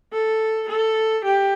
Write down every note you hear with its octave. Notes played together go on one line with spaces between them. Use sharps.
A4
A4
G4